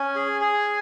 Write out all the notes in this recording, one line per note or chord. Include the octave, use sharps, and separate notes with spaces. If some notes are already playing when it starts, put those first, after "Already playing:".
Already playing: C#4 G#5
G#4
G#4